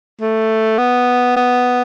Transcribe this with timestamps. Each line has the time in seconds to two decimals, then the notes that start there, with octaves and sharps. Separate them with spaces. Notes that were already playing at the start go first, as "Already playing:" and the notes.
0.21 A3
0.78 B3
1.36 B3